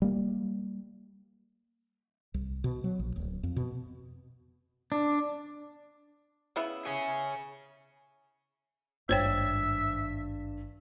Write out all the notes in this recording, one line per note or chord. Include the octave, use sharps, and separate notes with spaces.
G3 A#3
C2
B2
F#3
A#1
D1
F2
B2
D4
C#3 B3 E4
G#4 C#5 G#5
G#1 G2 D#3 C5 C#5 E5 G5 A6